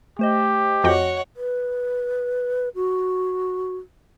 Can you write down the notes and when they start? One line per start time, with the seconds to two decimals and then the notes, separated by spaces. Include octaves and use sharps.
0.19 A3 G4 C5 D#5
0.84 F2 F#4 C#5 D#5 F#5 G5
1.36 B4
2.75 F#4